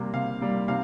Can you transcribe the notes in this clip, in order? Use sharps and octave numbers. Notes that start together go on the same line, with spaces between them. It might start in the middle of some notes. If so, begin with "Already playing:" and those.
Already playing: C3 G3 A#3
C3 F5
G3 A#3
C3 F5